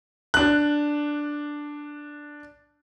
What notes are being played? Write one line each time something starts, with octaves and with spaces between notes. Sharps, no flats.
D4 F#6